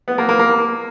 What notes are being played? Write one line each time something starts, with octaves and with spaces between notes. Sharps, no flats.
B3
A#3
A#3
A#3